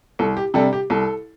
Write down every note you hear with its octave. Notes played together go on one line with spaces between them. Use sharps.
C2 A4
G4
C3 G3 D4 A4
G4
C2 A4